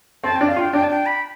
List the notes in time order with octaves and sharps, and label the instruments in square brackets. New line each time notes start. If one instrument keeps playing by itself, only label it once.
[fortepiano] C4 [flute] A5
[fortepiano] D4 [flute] G5
[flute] F5
[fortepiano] F4 [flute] G5
[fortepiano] D4 [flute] G5
[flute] A5
G5
B5